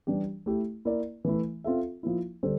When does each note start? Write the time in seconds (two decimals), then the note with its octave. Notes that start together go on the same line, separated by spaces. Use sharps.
0.07 E3 G3 D4 G4
0.46 A3 E4 G4
0.85 A#3 E4 A#4 D5
1.25 E3 A3 E4
1.64 C4 F4 A4 E5
2.03 F3 A#3 E4
2.43 D3 G3 D4 A4 C5